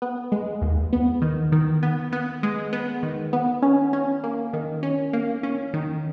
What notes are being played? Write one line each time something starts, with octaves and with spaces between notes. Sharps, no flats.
B3
G#3
D#2
B3
D#3
D#3
B3
B3
G#3
B3
D#3
B3
C#4
C#4
A#3
D#3
C#4
A#3
C#4
D#3